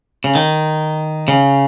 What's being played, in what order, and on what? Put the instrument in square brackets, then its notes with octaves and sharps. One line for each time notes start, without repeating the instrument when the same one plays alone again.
[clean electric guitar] C#3
D#3
C#3